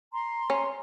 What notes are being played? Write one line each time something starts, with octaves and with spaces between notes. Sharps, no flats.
A#5 C6
C#4